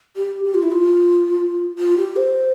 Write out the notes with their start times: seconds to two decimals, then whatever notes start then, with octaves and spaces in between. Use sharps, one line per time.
0.16 G4
0.45 G4
0.54 F4
0.63 E4
0.72 F4
1.79 F4
1.98 G4
2.16 C5